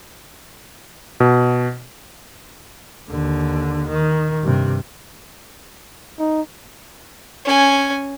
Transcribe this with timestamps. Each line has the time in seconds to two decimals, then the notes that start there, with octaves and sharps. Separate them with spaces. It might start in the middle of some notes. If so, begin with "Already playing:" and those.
1.20 B2
3.10 D#2 D3
3.88 D#3
4.43 G2 C3
6.19 D#4
7.45 C#4 G#5